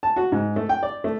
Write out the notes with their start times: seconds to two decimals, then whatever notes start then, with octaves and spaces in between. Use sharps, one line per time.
0.03 A5
0.16 F#4
0.32 G#2
0.56 A3
0.69 G5
0.83 D5
1.04 A3